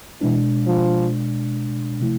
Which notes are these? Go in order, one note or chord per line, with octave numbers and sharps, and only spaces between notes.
B2 E3 G#3 D4
F3
C3 F3 A3 E4